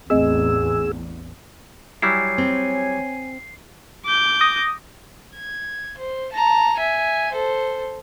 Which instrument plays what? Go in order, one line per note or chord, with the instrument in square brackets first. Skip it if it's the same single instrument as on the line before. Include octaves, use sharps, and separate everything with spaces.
[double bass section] A1 E2 [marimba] A3 C4 D#5 [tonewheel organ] G#4 E6
[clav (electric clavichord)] F#3 G3 E4 [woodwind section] C#5 G#5 [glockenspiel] C7
[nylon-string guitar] C4
[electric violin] D6 G6
[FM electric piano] D#6 A#6
[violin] G#6
C5
A5 A#5
E5 G#5
A4 C5